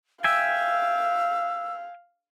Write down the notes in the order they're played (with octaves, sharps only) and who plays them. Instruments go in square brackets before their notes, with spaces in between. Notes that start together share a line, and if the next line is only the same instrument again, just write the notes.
[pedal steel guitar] E5 G5 G#5 [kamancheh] F5 [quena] E6